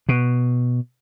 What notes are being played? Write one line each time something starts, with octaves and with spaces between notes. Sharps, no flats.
B2